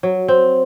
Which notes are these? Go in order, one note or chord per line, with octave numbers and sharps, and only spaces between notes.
F#3
C4